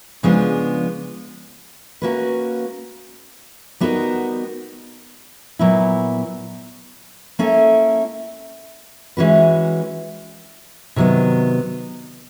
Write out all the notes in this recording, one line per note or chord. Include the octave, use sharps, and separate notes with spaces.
C#3 F3 G#3 B3 D4
A#3 C#4 F#4 B4
G3 B3 D#4 F#4 A#4
A#2 F#3 B3 E4
A#3 C#4 E4 A4
E3 G#3 C#4 F#4 B4
C3 D#3 F#3 B3